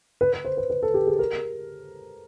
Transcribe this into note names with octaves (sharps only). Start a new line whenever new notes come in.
B4
B4
C5
B4
B4
A4
G4
G#4
A#4